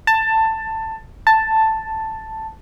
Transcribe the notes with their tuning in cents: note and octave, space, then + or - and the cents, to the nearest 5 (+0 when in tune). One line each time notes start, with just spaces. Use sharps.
A5 +15
A5 +5